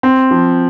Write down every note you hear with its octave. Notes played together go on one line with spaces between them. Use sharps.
C4
F3